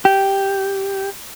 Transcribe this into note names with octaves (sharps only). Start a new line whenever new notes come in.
G4